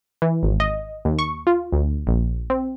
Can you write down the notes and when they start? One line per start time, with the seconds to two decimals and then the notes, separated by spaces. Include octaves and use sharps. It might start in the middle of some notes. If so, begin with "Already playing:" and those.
0.22 E3
0.43 G#1
0.60 D#5
1.05 D#2
1.19 C#6
1.47 F4
1.72 D2
2.07 A#1
2.50 C4